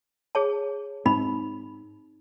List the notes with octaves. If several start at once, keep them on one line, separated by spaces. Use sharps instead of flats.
G#4 C#5 A5
G#2 C4 D#4 B5